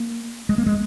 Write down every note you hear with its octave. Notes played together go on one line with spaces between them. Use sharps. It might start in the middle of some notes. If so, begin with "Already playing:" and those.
Already playing: A#3
G#3
A#3
G#3